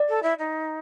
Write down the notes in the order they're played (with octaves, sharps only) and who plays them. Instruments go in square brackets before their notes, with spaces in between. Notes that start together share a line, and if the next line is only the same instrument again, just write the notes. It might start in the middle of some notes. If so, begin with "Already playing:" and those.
Already playing: [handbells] D5
[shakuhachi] A4
E4
D#4